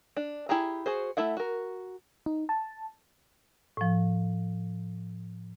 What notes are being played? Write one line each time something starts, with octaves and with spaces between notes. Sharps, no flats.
D4
E4 G4 G#4 A#5
F#4 G#4 C5
A3 E4 E5 F#5
F#4 A#4
D#4
A5
A2 F3